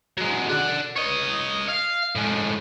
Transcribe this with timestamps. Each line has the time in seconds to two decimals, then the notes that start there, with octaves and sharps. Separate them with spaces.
0.17 F#3 G#3
0.49 D5 F#5
0.96 C#5 D#5
1.69 F5
2.15 A2 G#3